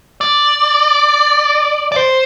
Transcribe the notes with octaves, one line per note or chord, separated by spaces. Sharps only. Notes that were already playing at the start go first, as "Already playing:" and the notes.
D5
D5
C5